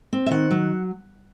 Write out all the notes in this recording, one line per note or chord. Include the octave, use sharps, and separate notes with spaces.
C4
E5
D#3 F#5
F#3